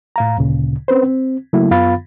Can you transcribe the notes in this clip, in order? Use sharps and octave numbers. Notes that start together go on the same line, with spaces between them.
A2 F5 A#5
D2 A#2 C#3
C4 C#4 B4 C5
C4
C#3 F#3 A3 A#3 E4
F#2 B3 F4 F5 B5 A6